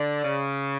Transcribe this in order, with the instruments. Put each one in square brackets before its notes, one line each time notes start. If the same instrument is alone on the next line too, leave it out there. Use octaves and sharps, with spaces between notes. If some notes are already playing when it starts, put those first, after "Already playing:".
Already playing: [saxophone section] D3 [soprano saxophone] D5
[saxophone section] C#3